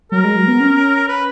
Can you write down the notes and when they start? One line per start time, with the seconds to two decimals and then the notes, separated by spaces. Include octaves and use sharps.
0.12 F#3 A#4
0.24 G#3
0.36 F#3
0.48 B3
0.60 C#4
1.08 B4